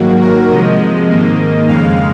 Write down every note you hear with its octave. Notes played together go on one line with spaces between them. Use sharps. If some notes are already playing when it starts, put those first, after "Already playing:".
Already playing: G#2 D#3 F#3 A#3 F#4
A#4
C3 F3 G#3 D#5
G#2 D#3 A#3
F2 C#3 G#3 F5